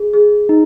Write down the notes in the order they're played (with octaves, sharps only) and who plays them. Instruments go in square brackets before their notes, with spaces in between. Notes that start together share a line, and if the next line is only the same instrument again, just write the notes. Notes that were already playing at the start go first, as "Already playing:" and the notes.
Already playing: [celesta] G#4
G#4
[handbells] D#4